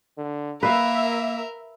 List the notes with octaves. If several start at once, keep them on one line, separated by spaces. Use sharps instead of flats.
D3
A#3 A#4 B4 E5 F5